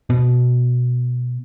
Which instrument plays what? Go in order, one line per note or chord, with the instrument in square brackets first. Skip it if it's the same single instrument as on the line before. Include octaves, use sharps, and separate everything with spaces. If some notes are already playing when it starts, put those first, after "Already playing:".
[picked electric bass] B2